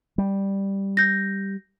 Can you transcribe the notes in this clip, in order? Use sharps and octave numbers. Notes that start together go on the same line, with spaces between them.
G3
G6 A#6